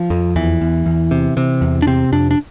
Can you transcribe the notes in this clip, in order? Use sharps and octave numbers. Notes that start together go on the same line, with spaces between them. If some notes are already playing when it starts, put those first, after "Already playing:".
Already playing: F3
F2
E2 E3
E2
E2
C3
C3
E2
D4
C3 C4
F2 D4
D4